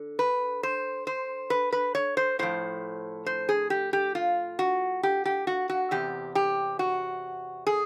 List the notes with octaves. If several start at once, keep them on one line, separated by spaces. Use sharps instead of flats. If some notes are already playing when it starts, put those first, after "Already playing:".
Already playing: D3
B4
C5
C5
B4
B4
C#5
C5
A2 F3 C5
C5
G#4
G4
G4
F4
F#4
G4
G4
F#4
F#4
E2 C3 G4
G4
F#4
G#4